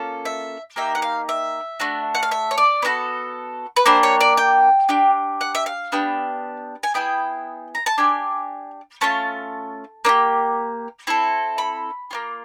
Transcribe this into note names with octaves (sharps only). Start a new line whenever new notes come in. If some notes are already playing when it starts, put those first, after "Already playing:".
Already playing: A#3 C#4 F4 A4
E5
A#3 D#4 G4 E5
F#5
F5
E5
A3 D4 F#4
F#5
F5
E5
C#5
D5
B3 D4 F#4 A4
B4
A#3 D4 G4 C5
C#5
D5
G5
D4 G4
F#5
E5
F5
B3 D4 G4
G#5
B3 E4 G#4 G5
A#5
A5
D4 G4 G#5
A3 C#4 F4 A5
A#3 D4 G4
C4 E4 A4
B5
A#3 C#4 F4